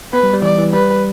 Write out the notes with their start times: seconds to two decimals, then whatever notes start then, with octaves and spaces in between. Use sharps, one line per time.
0.13 B3 B4
0.23 G3
0.33 G3
0.42 E3 D5
0.58 E3
0.73 G3 B4